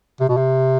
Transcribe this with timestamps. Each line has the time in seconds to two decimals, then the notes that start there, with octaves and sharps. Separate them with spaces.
0.20 C3
0.29 B2
0.37 C3